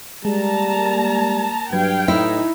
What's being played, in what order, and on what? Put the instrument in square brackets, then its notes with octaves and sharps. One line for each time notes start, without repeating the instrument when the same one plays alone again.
[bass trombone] G3 [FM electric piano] G#3 [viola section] A#3 A5 A#5
[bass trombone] G2 [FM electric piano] F#3 B4 G#6 [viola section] F5 G5
[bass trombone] A2 [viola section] D#4 [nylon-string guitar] E4